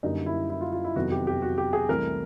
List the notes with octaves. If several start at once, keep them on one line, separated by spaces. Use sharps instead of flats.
F#2 D3 G3 A#3 D#4
E4
E4
F4
F4
E4
F2 C3 D#3 F#3 B3 F#4
G4
G4
F#4
G4
G#4
C2 C3 E3 A3 A#4